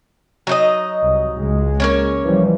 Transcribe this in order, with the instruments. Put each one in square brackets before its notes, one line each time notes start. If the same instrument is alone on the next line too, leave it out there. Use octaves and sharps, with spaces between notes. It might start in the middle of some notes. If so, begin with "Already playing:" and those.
[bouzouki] F#3 D#4 D#5
[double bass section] C2
C#2 G#3
[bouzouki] A#3 C#4 C#5
[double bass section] E3 F3 G3